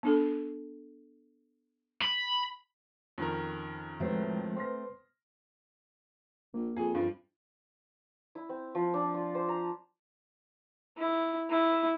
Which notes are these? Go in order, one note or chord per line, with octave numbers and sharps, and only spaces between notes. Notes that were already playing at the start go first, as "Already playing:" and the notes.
B3 D4 A4
B5
F2 D#3 C#4 A#4
A2 F3 G#3 A3 C4 F#4 B4
B4 C5 C6 F6 A#6
A#1 A#3
F2 G#4
G2 F3
E4
C4
F3
D4
F4
C5
A#5
E4
E4